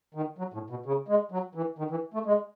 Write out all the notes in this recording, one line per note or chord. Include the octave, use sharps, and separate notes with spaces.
D#3
F#3
A2
B2
C#3
G#3
F#3
E3
D#3
E3
A3
G#3